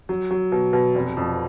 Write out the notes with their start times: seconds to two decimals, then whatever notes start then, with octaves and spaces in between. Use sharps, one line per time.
0.09 F#3
0.31 F#3
0.52 B2
0.73 B2
0.95 F1
1.17 F2